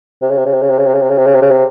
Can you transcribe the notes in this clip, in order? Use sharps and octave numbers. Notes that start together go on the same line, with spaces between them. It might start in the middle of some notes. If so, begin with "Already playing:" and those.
C3
C#3
C3
C#3
C3
C#3
C3
C#3
C3
C#3
C3
C#3
C3
C#3
C3
C#3
C3